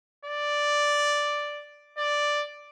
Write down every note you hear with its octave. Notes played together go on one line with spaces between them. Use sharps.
D5
D5